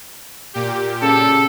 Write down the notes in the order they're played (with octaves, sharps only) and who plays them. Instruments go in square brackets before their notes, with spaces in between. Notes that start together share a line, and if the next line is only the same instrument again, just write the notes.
[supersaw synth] A#2 G4
[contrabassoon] C#3 [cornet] A4